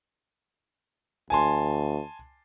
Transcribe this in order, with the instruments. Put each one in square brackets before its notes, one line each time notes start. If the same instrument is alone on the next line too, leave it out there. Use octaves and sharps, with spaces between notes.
[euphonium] D2 [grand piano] G#5 A5 C6